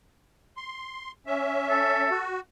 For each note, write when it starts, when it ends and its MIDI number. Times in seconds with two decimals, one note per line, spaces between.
0.57 1.12 84
1.27 2.09 61
1.27 2.09 76
1.70 2.22 69
2.11 2.40 66